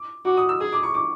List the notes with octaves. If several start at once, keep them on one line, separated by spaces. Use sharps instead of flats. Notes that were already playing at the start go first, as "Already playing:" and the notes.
Already playing: D6
F#4 D6
D#6
E6
G#4 D#6
D6
C#6
D6